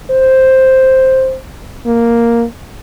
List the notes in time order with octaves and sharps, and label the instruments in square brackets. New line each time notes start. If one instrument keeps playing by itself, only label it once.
[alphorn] C5
A#3